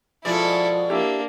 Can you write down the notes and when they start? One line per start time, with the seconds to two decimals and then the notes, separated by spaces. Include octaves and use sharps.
0.25 B2 F3 G#3 E4 A4 D5
0.90 A#3 D4 E4 G4